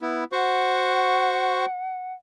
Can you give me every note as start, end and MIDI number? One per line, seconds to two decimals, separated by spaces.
0.01 0.24 59
0.01 0.24 64
0.32 1.66 66
0.32 1.66 72
0.32 2.13 78
0.32 1.66 85